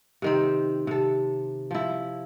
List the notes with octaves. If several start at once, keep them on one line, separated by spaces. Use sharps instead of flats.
C3 D#3 C4
C3 A4
F3 E4